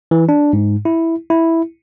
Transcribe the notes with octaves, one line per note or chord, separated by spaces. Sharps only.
E3
D4
G#2
E4
E4